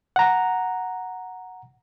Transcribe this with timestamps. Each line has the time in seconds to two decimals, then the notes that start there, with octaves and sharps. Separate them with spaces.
0.16 F#5 A#5